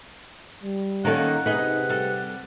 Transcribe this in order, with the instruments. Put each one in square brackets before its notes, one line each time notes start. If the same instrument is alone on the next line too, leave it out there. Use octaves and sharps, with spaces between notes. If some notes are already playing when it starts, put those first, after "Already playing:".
[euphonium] G3
[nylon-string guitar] D#3 C#4 A4 [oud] A#3 D#4 [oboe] F#5
[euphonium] C3 [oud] D#4 [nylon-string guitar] G#4 B4
[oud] G3 A4